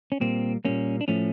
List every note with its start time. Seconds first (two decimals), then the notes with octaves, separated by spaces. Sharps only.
0.12 C#4
0.21 A#2 G3 A#3 C4
0.65 A#2 G3 A#3 C#4
1.01 D4
1.08 A2 F3 A3 C#4